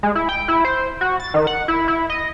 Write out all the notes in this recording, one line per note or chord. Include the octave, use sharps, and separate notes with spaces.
G#3
E4
G5
E4
C5
F#4
A6
D#3
F#5
E4
E4
D#5